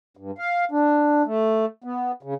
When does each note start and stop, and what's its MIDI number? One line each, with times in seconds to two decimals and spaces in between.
0.17 0.31 43
0.38 0.64 77
0.71 1.22 62
1.26 1.65 57
1.84 2.12 59
2.23 2.34 49